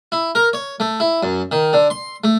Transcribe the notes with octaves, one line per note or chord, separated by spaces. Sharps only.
E4
A#4
C#5
A3
E4
F#2
D#3
D3
C6
A3